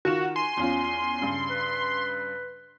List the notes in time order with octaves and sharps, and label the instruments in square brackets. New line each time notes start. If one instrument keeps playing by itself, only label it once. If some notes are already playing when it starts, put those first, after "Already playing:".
[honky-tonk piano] D#3 F4 E7 [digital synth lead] F#4
[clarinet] G#5 [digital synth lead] C6
[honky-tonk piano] E2 C#4 F4
G2 C#3
[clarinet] B4